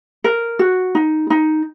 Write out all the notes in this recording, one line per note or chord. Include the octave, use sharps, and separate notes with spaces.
A#4
F#4
D#4
D#4